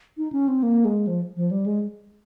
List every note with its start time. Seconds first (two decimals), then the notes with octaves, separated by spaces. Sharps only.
0.17 D#4
0.32 C#4
0.48 C4
0.63 A#3
0.85 G#3
1.07 F3
1.36 F3
1.51 G3
1.66 G#3